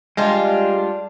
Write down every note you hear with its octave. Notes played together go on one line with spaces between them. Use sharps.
G3 G#3 D4 F4